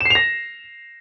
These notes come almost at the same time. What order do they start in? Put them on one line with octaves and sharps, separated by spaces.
E7 C7 F7 A#6